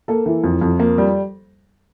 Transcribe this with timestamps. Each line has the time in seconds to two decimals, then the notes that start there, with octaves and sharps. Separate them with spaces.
0.08 A#3 A4
0.26 E3
0.44 F2
0.61 F2
0.79 A#3
0.98 G3